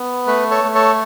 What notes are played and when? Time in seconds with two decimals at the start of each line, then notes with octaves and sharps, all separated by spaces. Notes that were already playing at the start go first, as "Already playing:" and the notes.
Already playing: B3
0.27 A3 B4
0.51 A4 C#5
0.63 A3
0.75 A4 C#5